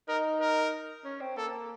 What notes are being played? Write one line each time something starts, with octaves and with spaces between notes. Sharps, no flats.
D#4 A#4
A#4
C#4
C4
A#3 A4